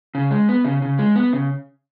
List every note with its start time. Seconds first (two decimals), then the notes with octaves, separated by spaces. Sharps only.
0.15 C#3
0.31 G#3
0.49 B3
0.65 C#3
0.82 C#3
0.99 G#3
1.16 B3
1.33 C#3